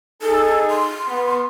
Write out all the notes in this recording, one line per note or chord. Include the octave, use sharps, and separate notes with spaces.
D#4 G#4 A4
C6
B3